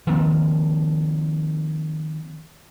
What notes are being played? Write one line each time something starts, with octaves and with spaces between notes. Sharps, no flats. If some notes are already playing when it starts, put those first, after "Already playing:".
D#3 F3 A#3 C4